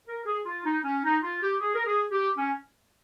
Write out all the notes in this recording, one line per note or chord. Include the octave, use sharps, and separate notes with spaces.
A#4
G#4
F4
D#4
C#4
D#4
F4
G4
G#4
A#4
G#4
G4
C#4